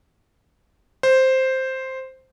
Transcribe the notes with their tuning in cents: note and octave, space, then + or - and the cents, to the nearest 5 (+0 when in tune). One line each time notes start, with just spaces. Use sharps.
C5 +0